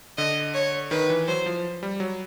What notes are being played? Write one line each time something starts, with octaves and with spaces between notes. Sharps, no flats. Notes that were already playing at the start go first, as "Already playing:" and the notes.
D3 D#5
C#5
D#3 B4
E3
F#3 C5
F3
G3
F#3